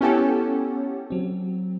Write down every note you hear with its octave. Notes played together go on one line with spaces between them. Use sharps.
B3 C#4 E4 G4 A4 F#5
F#3 C4